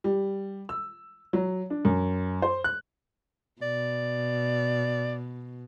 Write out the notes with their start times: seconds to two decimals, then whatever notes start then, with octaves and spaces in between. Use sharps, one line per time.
0.04 G3
0.69 E6
1.33 F#3
1.70 D4
1.85 F#2
2.42 C5
2.64 F#6
3.62 B2 D5